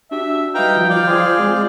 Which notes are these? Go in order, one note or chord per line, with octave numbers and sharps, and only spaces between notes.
D4 F#4 G4 E5
G3 D#4 F#4 B4 F5 G5 A#5
F3
D5 F5 G5 G6
F4 G#4 C5
G#3 C4 G6